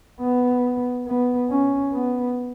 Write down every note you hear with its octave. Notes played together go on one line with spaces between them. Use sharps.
B3
B3
C#4
B3